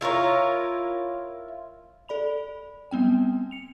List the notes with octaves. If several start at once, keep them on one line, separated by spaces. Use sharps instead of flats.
E4 F4 A#4 C#5
A4 D5 B5 F7
G3 B3 C4 G5
C#7 F7